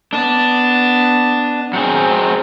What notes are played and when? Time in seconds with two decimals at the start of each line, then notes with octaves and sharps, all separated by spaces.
0.13 B3 D4 A5
1.73 F#3 C4 G#4